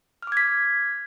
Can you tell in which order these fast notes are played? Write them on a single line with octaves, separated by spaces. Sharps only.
F6 D6 G#6 B6